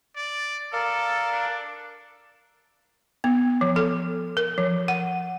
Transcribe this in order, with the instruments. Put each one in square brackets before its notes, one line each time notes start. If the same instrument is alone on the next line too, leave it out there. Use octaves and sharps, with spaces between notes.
[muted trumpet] D5
[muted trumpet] A4 [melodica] A#4 D5 F5
[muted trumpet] D4
[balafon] B3
F3
A4
A#4
F3
F#5